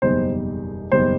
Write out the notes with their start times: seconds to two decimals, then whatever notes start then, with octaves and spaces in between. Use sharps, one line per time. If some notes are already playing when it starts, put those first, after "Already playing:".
0.02 F#1 E2 B2 G3 D#4 C5
0.92 F#1 E2 B2 G3 D#4 C5